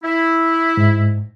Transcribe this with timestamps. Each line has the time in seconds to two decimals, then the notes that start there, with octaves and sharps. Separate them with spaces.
0.03 E4
0.77 G#2